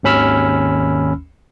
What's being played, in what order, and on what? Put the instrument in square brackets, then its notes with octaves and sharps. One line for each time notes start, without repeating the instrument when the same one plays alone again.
[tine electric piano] G#1 D#2 C#4 B5 E6 F6